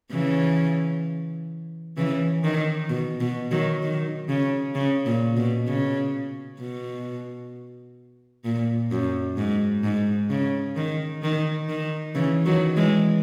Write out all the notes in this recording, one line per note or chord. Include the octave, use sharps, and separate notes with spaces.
C#3 E3
C#3 E3
D#3
B2
B2
D#3 F#3
D#3
C#3
C#3
A#2
B2
C#3
B2
A#2
F#2
G#2
G#2
C#3
D#3
D#3
D#3
C#3 E3
D#3 F#3
E3 G#3